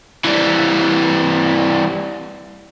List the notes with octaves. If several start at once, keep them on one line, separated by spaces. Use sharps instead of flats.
E3 G3